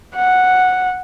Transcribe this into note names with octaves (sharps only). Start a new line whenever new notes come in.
F#5